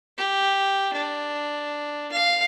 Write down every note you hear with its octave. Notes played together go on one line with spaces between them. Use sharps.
G4
D4
F5